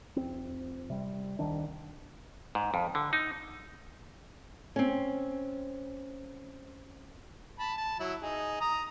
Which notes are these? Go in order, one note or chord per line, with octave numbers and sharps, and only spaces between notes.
F1 C4
C3 G3
D#1 C2 D#3 D4
G#2
F2
D3
D#4
C4 C#4
A5 B5
A5
F#3 E4
D#4 G#4
A#5 D#6